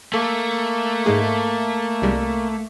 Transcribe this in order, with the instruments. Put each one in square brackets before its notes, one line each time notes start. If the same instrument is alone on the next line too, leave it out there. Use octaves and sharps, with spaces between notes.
[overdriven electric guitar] A3 [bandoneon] A#3 [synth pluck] A4
[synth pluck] G#2 G#3 G#4
C2 G3 G#3